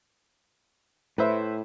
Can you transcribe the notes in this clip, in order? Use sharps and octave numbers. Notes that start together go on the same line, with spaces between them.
A2 B4 C5 E5